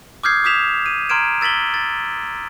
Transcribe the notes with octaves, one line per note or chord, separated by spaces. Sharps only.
D6 D#6 F6 G6 G#6 C7
D6 D#6 G6 B6 E7 F7
D#7
A#5 C6 F6 G#6 D7 E7
E6 A6 B6 F#7 G7
A6